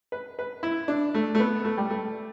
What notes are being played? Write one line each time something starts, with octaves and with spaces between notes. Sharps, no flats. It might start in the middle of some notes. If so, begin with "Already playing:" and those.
B4
B4
E4
D4
A3
A3
B3
A3
G3
A3